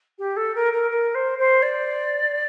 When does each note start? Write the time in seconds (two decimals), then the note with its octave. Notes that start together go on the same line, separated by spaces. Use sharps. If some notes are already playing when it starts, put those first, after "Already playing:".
0.19 G4
0.37 A4
0.55 A#4
0.73 A#4
0.91 A#4
1.15 C5
1.39 C5
1.62 D5